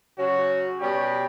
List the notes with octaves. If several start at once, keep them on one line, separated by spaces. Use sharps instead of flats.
C#3 F#3 C#4 F#4
B2 G3 C#4 G4